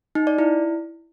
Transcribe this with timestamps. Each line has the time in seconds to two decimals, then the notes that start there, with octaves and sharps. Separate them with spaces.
0.15 D#4
0.27 D5
0.38 E4